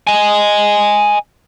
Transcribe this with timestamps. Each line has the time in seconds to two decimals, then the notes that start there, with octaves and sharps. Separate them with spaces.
0.07 D#5 G#5